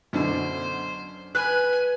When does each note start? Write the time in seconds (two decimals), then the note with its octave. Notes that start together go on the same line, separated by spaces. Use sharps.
0.13 F#2 B2 D3 C5
1.35 B4 G#5 F#6